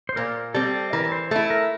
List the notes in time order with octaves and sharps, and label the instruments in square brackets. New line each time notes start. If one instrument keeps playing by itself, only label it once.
[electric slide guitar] C5
[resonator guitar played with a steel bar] A#2 [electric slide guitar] A#4
[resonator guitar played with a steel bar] G3 C4 [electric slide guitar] A4
[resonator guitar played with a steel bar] E3 [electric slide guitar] A#4
[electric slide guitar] C5
[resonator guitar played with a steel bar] A3 E4 [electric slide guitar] A4
[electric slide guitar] A#4